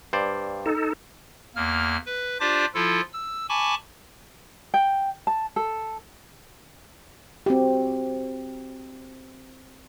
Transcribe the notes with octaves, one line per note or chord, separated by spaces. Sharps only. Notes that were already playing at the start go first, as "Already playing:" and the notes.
G2 C5 D5
D#4 A4
E2 A#3 F6
B4
D4 F4 G4 C5 D5 D6
F3 E4 F4 A4
E6
G#5 A5 B5 C#6 D6
G5
A5
A4
C4 F#4 G4